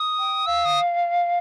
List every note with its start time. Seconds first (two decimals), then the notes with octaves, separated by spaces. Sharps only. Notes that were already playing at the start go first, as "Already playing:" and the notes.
Already playing: D#6
0.19 G5
0.46 F5 E6
0.65 D#6